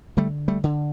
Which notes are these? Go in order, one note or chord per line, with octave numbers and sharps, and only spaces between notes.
D3 G3 A3
G3 A3
D3